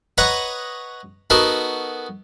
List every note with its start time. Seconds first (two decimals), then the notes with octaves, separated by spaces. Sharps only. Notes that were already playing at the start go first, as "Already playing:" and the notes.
0.18 B4 C#5 D#5 F#5 A#5 D#6
1.30 B3 D#4 F#4 A4 A#4